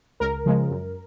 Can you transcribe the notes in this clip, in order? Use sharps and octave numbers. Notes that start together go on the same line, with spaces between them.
C#2 A#4
C#3 F3 G#3
F#2